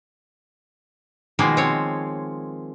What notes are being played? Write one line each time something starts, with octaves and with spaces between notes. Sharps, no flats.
B2 D#3 F3 G#3 A#3
C4 C#5